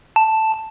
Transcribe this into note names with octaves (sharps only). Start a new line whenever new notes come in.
A5